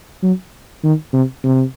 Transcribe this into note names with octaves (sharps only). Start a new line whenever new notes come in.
F#3
D#3
C3
C3